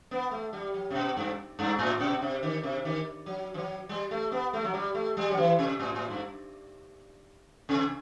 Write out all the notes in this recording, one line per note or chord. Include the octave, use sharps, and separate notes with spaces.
B3
A3
G3
F#3
C3
B2
G2
G2
A2
B2
C3
D#3
C3
D#3
F#3
E3
F#3
G3
A3
B3
A3
F#3
G3
A3
G3
F#3
E3
C3
A2
A2
G2
C3